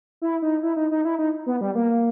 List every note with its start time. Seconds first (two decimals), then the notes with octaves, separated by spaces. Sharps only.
0.22 E4
0.42 D#4
0.63 E4
0.76 D#4
0.91 D#4
1.05 E4
1.19 D#4
1.46 B3
1.61 G3
1.75 A#3